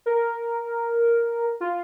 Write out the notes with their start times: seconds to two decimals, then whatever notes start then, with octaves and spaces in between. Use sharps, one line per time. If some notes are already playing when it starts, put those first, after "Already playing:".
0.06 A#4
1.60 F4